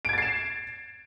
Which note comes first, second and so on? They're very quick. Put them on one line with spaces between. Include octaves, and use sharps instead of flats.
D7 G#6 A6 C7 E7